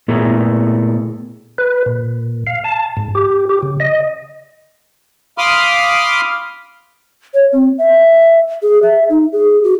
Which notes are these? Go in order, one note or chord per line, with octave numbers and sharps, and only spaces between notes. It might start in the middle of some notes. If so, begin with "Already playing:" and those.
A#2 A3 B3 E4 G#4 A#4
B4
A#2
F5
A5
G#2
G4
G4
C#3
D#5
F5 B5 C6 D6 D#6 F6
C#5
C4
E5
G#4
E5
D#4
G#4
F#4